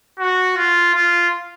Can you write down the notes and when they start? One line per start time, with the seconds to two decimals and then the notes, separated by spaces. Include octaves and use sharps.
0.19 F#4
0.57 F4
0.94 F4